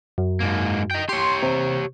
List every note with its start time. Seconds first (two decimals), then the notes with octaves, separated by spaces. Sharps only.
0.18 F#2
0.40 G#2 A#3
0.91 D#5 G5
1.09 G4 C#5 C6
1.42 C3